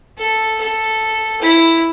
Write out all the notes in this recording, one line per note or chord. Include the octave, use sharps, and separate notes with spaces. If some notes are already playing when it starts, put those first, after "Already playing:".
A4
A4
E4